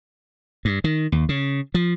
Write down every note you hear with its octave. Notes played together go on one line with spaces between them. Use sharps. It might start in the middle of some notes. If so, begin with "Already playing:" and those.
G2
D#3
D#2
C#3
F3